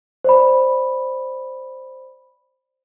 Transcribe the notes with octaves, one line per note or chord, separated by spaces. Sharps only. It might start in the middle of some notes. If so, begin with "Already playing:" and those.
C5 D5 B5